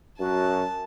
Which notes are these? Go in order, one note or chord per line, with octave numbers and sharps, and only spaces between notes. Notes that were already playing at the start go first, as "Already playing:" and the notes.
F#2 F#4 A5